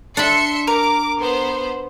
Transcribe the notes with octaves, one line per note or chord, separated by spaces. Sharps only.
D4 E5 B5 C6 C#7
A#4 D6
B3 C5